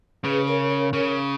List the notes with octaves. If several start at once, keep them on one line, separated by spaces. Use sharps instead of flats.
C#3 G#4 B4
A#4 C#5
A#4 C#5
C#3 A#4 C#5